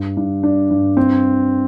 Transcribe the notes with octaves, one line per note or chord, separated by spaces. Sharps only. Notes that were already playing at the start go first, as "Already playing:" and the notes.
Already playing: G2
G2
D4
G2
C4